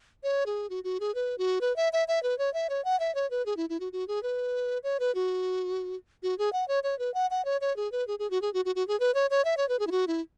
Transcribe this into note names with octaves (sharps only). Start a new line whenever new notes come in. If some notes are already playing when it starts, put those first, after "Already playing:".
C#5
G#4
F#4
F#4
G#4
B4
F#4
B4
E5
E5
E5
B4
C#5
E5
C#5
F#5
E5
C#5
B4
G#4
E4
E4
F#4
F#4
G#4
B4
C#5
B4
F#4
F#4
G#4
F#5
C#5
C#5
B4
F#5
F#5
C#5
C#5
G#4
B4
G#4
G#4
F#4
G#4
F#4
F#4
F#4
G#4
B4
C#5
C#5
E5
C#5
B4
G#4
E4
F#4
E4